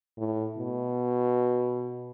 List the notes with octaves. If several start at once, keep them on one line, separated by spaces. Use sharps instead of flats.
A2
B2